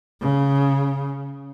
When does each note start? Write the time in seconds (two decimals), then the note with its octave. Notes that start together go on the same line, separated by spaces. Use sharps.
0.22 C#3